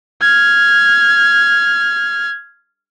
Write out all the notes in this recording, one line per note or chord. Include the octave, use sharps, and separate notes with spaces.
F6 G#6